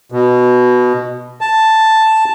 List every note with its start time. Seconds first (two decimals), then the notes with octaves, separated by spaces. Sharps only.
0.12 B2
1.41 A5